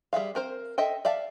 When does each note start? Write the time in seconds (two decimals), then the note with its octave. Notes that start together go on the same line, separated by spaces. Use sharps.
0.13 G3 G#4 E5 F5
0.35 C4 A#4 C5
0.78 A4 D#5 E5 G5
1.05 D5 E5 F5 A5